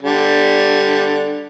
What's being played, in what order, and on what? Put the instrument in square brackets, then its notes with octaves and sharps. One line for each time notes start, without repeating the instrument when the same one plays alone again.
[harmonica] D3 G3